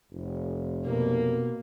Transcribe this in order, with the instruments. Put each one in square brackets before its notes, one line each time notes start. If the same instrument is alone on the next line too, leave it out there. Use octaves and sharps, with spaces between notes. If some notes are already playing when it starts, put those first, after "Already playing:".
[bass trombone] F1
[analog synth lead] B2 [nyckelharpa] A#3